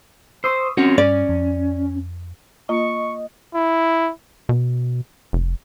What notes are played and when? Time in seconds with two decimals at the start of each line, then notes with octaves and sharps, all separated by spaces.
0.44 C5 C#6 D#6 E6
0.77 C4 C#4 F#4 A#4 C#5
0.98 G2 C#4 D5
1.29 F2
2.69 A#3 F4 D#5 C#6
3.55 E4
4.49 B2
5.33 F1